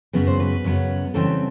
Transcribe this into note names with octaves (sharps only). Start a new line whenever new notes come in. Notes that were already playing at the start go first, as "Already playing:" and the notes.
F#2 C#3 F#3 B3 B4
C5
B4
F#2 C#3 F#3 B3
C#3 E3 G3 C4 A4